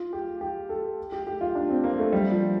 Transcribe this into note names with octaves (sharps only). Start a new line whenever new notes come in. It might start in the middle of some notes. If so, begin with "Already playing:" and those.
Already playing: F4
G4
G4
A4
G4
G4
F4
D4
C4
A#3
A3
G3
F3